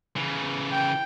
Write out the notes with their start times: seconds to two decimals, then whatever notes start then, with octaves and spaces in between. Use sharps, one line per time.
0.16 C#3 E3
0.72 G5